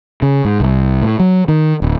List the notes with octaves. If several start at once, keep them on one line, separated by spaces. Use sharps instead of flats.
C#3
G#2
C2
A2
F#3
D#3
D1